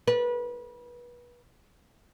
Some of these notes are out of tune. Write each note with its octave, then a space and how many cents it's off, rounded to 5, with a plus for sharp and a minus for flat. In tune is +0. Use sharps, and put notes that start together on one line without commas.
B4 -30